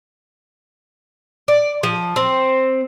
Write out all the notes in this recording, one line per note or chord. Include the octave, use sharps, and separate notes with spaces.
D5
F3
C4